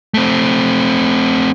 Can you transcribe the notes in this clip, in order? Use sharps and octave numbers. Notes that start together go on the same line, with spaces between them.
A3 C4